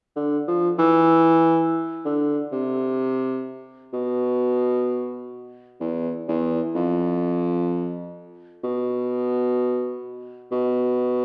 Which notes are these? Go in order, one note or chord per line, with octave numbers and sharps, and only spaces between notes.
D3
F3
E3
D3
C3
B2
E2
E2
F2
B2
B2